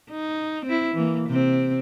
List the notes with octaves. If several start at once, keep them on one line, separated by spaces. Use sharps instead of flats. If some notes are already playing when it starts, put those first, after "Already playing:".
D#4
C4 E4
E3 A#3
C3 C4